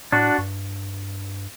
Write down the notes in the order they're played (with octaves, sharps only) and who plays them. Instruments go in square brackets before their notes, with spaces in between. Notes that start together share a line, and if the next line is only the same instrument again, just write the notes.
[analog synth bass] A2 [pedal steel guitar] D4 F#4
[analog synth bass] G2